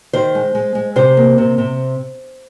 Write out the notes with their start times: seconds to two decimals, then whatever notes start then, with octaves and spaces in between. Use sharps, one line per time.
0.13 D#3 C5
0.35 G#3
0.55 G#3
0.75 G#3
0.96 C3 C5
1.17 A#3
1.38 C3
1.58 C3